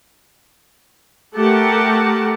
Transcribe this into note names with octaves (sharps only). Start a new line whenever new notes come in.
A3 G4 A#4 F#5 A5